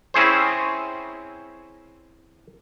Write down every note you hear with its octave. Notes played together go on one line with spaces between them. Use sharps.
C4 C#4 E4 G#4 C5